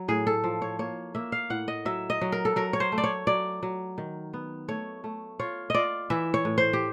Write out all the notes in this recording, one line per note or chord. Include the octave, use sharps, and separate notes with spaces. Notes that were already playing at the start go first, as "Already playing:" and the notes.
Already playing: F#3
A2 G#4
A4
F3
C#5
A#3 C#5
A#3 E5
F5
A2 F#5
D#5
F#3 E5
D#5
F#3
A#4
A4
F#3 A#4
C#5
C5
A3
D5
C#5
F#3 D5
F#3
D#3
B3
A3 C#5
A3
F4 C#5
F4 D5 D#5
E3 E5
C#5
A2
C5
G4